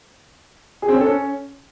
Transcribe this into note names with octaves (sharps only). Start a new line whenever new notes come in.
G#4
C4
C#4
A4
C#4